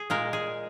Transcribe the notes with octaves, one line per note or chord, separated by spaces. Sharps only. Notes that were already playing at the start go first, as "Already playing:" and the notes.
Already playing: G#4
A#2 G#3 A#4
G#4